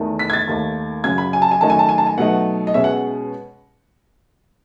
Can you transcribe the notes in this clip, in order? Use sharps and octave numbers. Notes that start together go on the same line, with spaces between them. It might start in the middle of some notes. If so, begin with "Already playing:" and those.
Already playing: E2 D#3 A3 D#4
B6
G#6
A6
D#2 D#3 A3 D#4
F#2 C#3 F#3 G#6
B5
G#5
A5
G#5
F#2 D#3 A3 D#4 A5
G#5
A5
G#5
A5
G#5
B2 F#3 A3 D#4 F#5
D#5
B2 G#3 C#4 E5
F#5